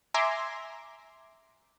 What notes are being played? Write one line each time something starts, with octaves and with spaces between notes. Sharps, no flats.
E5 G#5 A#5 C6 D6